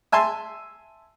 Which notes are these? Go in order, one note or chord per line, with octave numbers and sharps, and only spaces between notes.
E5 G#5 A5 C6